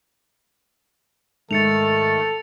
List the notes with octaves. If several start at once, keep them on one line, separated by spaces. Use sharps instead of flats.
G#2 D#3 A3 A4 A6 C#7 F7